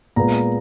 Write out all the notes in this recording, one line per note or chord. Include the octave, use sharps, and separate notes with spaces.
A#2 G#3 B3 A#5